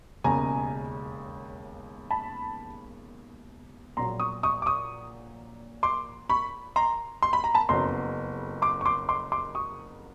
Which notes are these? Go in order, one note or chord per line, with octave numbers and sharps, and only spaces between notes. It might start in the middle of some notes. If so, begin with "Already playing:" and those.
E1 D#2 C#3 G#5 A#5
A5 B5
A#1 A#2 F#3 A#5 C6
C#6 D#6
C#6 D#6
D6
C#6 D#6
C6 D6
B5 C#6
A#5 C6
C6
B5
A#5
A5 B5
F#1 F2 C#3 F#3 B3 A#5 C6
C6 D6
C#6
C6 D6
C6 D6
C6 D6
C#6 D#6